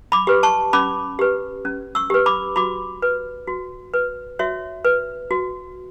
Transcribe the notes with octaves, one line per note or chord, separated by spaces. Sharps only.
B5 D6
G4 B4
A5 C#6
C#4 B5 D6
G4 B4
C#4
C#6 E6
G4 B4
B5 D6
F#4 B5 D6
B4
F#4
B4
F#4 C#5 E5
B4
F#4